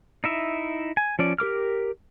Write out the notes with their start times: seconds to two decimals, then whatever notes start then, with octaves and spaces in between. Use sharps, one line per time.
0.24 D#4 E4 E5
0.97 G#5
1.19 F3 C#4 D5
1.38 G4 A#4 D6 F6